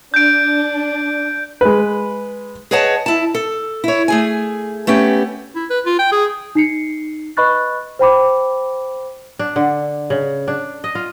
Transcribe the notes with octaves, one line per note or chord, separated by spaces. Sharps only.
D4 G6 D7
G#3 B4
G#4 B4 C#5 D#5 F#5 A5
E4 A5
A4
E4 C#5
A3 G#4 G#5
A3 B3 C#4 G4
E4
B4
F4
G5
G#4
D#4 C7 C#7
B4 D#5 B5 C#6 F#6 A6
C5 G5 B5 D6
D4
D3
C#3
D4
D#5
F4